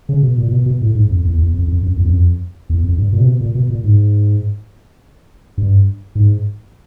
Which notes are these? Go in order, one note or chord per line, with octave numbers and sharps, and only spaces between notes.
C#3
B2
A#2
A#2
B2
B2
A2
G#2
F2
E2
E2
F2
F2
F#2
E2
F#2
F2
E2
F2
G2
A#2
C3
B2
A#2
B2
A#2
G#2
G2
G#2